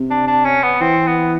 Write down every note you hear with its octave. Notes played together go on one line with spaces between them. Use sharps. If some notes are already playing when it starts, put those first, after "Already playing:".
Already playing: C3
D4
D4
C#4
B3
E3 C4
B3